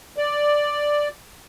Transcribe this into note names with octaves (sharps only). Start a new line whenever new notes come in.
D5